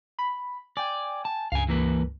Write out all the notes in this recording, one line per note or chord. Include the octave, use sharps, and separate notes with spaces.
B5
D5 G5 G#5
A5
C#2 G2 F5 G#5
E3 A#3 B4